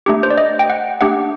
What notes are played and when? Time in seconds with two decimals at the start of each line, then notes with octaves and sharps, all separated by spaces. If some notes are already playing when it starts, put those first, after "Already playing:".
0.06 A3 D4 G4
0.23 C5
0.30 D5
0.38 D#5
0.59 G5
0.70 F#5
1.01 A3 D4 G4 F#5